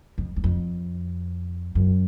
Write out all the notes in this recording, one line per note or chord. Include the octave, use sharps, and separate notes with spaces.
F2
E2
F2
F#2